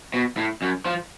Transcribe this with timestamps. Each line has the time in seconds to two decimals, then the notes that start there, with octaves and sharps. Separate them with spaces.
0.14 B2
0.37 A2
0.62 F#2
0.86 F3